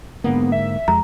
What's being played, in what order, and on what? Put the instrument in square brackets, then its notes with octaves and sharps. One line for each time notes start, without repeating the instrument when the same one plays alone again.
[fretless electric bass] G#2 D3 A#3 [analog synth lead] B3
[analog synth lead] E5
[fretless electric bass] F2 G#3 [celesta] A#5